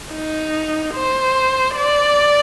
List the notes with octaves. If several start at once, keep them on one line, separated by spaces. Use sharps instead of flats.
D#4
C5
D5